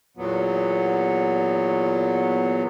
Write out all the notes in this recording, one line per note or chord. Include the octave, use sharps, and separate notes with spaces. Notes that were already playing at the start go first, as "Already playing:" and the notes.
E2 A#2 F#3 B3